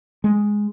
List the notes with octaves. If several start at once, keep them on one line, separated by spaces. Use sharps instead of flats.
G#3